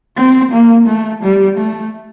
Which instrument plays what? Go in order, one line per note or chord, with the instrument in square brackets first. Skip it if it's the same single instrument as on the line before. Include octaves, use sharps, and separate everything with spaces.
[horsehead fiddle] C4
A#3
A3
G3
A3